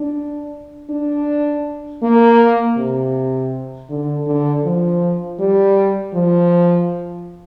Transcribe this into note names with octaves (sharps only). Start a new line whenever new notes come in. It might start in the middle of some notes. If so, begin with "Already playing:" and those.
Already playing: D4
D4
A#3
C3
D3
D3
F3
G3
F3